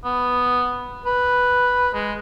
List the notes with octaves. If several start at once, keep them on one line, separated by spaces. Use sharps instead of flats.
B3
B4
G#3